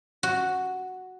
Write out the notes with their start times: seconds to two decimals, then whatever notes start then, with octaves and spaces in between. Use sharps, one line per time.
0.23 F#4